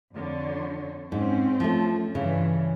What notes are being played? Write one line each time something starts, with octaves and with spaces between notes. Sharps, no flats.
F2 D3 C#5
G#2 C4 C#4
F3 A3
G2 C#3 E3